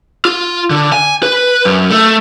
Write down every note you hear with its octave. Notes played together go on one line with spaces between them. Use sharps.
F4
D3
G#5
B4
F#2
A3